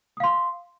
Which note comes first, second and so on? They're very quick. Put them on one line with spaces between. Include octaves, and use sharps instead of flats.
D#6 F5 C6